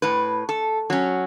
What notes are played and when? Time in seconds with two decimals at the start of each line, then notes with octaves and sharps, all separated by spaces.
0.02 A2 B4
0.49 A4
0.90 F#3 C#4